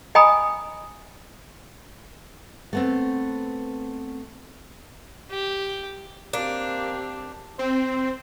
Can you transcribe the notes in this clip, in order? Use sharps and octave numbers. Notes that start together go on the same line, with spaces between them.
D#5 G5 G#5 A#5 B5 D#6
A3 B3 C4
G4
A#3 C4 D4 G4
C4 C5